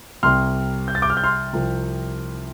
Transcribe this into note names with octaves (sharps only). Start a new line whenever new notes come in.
C2 C3 G3 C6 F6
G6
A6
D6 G6
F6
G6
C6 F6
C2 C3 F3